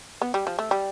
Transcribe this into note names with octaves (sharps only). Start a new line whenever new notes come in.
B3
G3
F3
A3
G3